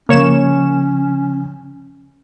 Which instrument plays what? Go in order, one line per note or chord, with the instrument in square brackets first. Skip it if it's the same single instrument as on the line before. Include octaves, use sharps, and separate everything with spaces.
[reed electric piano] C#3 F3 [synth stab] A#3 C#5 E7 [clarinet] C#4